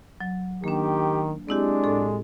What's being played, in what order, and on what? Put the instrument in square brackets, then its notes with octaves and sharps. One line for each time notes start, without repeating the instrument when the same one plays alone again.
[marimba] F#3
[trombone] D#3 [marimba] A#3 D4 [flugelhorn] G4
[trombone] G#3 [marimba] C4 E4 G4 [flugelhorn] D4
[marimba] A2 A4